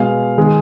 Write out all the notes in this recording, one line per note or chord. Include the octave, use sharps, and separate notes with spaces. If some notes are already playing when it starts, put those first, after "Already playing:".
Already playing: B2 G#3 F5
D#3 G#3